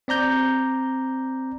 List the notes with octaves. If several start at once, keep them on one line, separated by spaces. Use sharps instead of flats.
C4 D5 A#5 G6